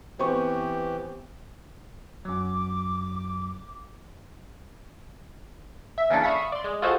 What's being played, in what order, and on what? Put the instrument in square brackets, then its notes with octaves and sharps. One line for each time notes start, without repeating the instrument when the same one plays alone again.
[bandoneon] E3 G4 [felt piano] B3 C4 C#6
[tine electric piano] F#2 F#3 [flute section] D6
[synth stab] E5
C#3 E3 A#3 C#4 D4 A4
E5 F5 B5 C#6 D#6 B6
D5 C6
G#3
F4 F#4 G#4 A4 C5 D#5